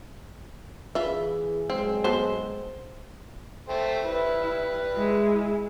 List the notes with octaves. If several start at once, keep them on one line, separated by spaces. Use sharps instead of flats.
E3 F4 G#4 B4 E5
G2 F#3 G#3 C4
B3 F#4 A4 C5
A3 C5 G5
G3 E4 B4
G#3 E4